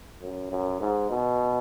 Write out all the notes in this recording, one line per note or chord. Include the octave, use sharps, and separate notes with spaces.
F#2
F#2
G#2
B2